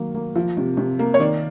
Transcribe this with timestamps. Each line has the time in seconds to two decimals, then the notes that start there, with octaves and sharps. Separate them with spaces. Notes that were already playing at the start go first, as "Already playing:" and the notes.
Already playing: D#3 F#3 A#3
0.15 A#3
0.35 F3
0.57 C3
0.77 C3
0.99 A#3
1.14 C#5
1.20 D#3 D5